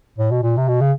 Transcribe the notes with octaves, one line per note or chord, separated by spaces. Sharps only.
A2
B2
A#2
C3
B2
C#3